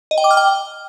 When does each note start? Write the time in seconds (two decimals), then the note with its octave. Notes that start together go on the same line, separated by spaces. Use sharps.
0.11 D#5
0.18 G5
0.24 D6
0.31 F6
0.37 G5